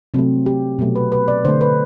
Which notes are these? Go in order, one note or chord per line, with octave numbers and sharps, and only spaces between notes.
C3 F#3 A3 C4
G4
B2 F#3 A3
B4
B4
D5
D3 A3 C5
B4